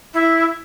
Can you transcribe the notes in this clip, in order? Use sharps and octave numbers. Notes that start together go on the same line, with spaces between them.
E4